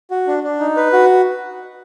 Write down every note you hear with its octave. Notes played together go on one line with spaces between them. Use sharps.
F#4
D4
D4
D#4
B4
F#4